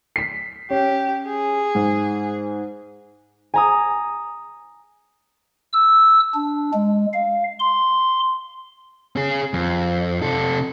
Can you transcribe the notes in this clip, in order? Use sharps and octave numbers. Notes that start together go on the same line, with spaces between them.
B6 C7
C#4 G4
G#4
G#2
G#5 A#5 D#6
E6
D4
G#3
F5
C6
C#4 G#4
F2
C3 A4